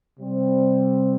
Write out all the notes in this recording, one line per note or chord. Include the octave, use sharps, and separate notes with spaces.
C3 G3 C4